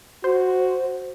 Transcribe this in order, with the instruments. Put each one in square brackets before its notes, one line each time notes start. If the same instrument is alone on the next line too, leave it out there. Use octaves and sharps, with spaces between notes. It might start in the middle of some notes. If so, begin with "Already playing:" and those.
[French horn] F#4 [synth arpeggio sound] C5